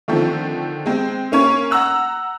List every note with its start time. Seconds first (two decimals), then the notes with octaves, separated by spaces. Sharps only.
0.08 D3 D#3 F3 A3 C4
0.86 G#3 C4
1.32 A#3 C#4 C#5
1.71 F#5 A#5 E6 F#6